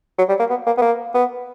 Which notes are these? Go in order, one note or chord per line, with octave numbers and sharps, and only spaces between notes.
F#3
G3
A#3
B3
A#3
B3
A#3
B3